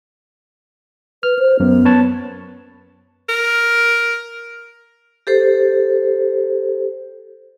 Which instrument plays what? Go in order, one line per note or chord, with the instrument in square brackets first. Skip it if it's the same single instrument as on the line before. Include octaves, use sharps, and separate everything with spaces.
[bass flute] B4 [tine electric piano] F6
[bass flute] C5
[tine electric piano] F#2 [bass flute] B3
[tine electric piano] B4 C#5 A5
[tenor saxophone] A#4
[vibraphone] G4 A4 C5